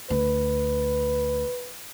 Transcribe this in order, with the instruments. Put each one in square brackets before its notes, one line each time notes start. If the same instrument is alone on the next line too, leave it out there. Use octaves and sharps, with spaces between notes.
[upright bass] D2 [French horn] B4